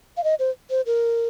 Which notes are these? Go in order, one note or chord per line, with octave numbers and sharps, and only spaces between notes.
F5
D#5
C5
C5
A#4